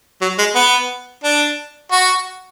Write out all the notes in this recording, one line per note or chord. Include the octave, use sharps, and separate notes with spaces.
F#3
G#3
B3
D4
F#4